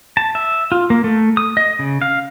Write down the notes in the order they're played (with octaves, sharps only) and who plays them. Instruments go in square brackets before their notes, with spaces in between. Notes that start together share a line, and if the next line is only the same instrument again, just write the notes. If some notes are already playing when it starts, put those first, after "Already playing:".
[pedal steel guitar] A5
E5
F4
A#3
A3
D#6
D#5
C#3
F5